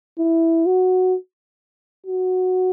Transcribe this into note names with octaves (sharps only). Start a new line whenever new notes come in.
E4
F#4
F#4